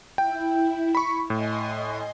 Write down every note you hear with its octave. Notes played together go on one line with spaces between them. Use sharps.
E4 G5
B5 C#6
A2 D#5 G#5 C6